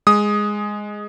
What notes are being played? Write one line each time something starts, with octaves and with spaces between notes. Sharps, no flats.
G#3 D#6